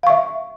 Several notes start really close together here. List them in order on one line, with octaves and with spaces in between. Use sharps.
F5 C#6 E5